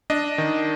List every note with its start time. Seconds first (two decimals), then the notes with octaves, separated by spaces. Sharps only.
0.10 D4 D#5
0.38 D#3